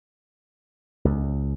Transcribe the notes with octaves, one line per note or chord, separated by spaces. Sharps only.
C#2